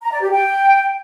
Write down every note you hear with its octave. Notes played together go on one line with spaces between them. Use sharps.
A#5
D5
G4
G5